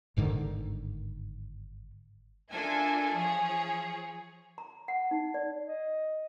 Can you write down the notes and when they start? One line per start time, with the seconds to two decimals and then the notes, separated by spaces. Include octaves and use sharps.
0.17 G1 G#2 D3 D#3
2.52 D4 F4 A4 A#4 E5 G#5
3.14 F3 G#4 C#5
4.58 A#5
4.88 F#5
5.11 D#4
5.34 D5
5.66 D#5